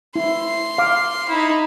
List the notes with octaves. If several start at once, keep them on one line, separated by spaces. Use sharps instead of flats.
E4 C6
F5 D6
D#4 E4